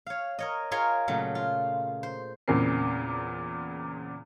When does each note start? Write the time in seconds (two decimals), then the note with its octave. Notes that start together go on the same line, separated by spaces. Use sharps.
0.07 C#5 F5
0.39 A#4 C#5 D#5
0.71 F4 G#4 A#4 C#5 G#5 C6
1.08 A#2 C#3 F#3 A3
1.35 F4
2.03 C5
2.48 E2 A#2 C#3 C4 A#4 C7